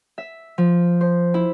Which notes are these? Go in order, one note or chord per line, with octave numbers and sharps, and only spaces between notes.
E5
F3
C5
E4